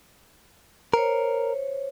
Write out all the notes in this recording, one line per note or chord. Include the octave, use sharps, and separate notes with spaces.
A#4 C5 C#5